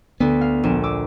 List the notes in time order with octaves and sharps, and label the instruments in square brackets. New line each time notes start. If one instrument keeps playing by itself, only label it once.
[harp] D2 [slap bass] B3
[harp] F5
A#1 D4 E7
D6 E6